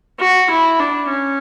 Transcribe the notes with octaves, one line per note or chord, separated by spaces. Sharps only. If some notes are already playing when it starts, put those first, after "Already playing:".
F#4
E4
D4
C#4